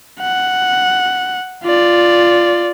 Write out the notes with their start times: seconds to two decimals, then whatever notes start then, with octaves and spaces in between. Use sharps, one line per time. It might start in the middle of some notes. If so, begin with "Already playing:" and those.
0.21 F#5
1.64 F4 D5